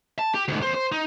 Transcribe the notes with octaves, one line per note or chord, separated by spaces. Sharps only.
A5
G4
D2 G#2
E2 C5
C5
D#4